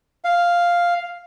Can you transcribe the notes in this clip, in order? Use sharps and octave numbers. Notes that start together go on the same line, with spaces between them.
F5